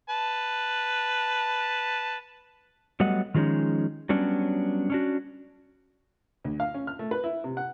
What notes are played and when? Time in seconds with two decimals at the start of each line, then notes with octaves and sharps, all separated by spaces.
0.10 B4 A5
3.00 F#3 G3 A3 B3 D#5 F#5
3.34 D#3 F3 G#3 C#4 D#4
4.09 F#3 G3 B3 C#4 D4
4.90 C#4 D4 F#4
6.44 D2
6.60 F5
6.74 C#4
6.87 F6
6.99 A3
7.11 B4
7.24 E4
7.44 C3
7.57 F#5